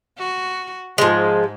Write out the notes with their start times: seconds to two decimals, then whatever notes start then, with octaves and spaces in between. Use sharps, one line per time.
0.18 F#4
0.98 G#2 F3 G#3